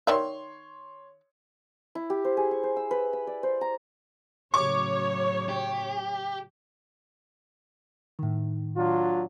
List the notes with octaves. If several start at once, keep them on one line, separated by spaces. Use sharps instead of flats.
D#3 C#5 D5 E5 C6
E4
G4
C5
G#4
C#6
C5
E6
B4
B5
D5
C5
A#5
A2 C#3 F#3 C#5 C#6 D6
G4
A2 D#3
F#3 D4 F4